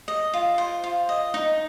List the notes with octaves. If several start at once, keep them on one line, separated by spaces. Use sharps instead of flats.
D#5
F4
C5
F4
D#5
D#4